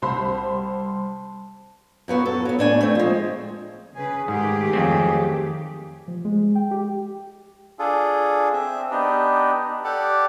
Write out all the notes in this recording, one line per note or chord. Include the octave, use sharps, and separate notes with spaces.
C2 G3 C5 A5 B5 C6
F#2 F#3 B3 F#4
A4
F#3 B3
A2 D4 G#5
A3 C4
F3 G#3
C#3 G#4 B4
G#2 D#3 A3 G4 G#4
F2 F#3 C4
F3
G#3
G5
G4
D4 F4 G#4 A4
C4 E5
B3 D4 D#4 G4
G4 A4 D5 F#5